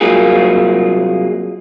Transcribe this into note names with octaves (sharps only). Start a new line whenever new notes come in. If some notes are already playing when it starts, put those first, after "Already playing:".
C2 F#3 A#3 F4 G#4